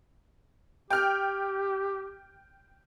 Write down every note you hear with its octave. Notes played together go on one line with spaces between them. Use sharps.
G4 G5 F6